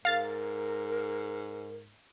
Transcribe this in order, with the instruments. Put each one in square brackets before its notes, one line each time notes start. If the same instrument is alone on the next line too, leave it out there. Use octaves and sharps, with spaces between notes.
[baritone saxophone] G#2 [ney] A#4 [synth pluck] F5 A6